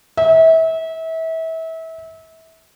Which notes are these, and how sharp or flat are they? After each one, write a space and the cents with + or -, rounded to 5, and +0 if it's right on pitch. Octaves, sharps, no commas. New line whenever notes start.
E5 -30